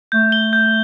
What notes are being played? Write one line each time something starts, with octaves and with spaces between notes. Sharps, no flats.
A3 G6
G7
G6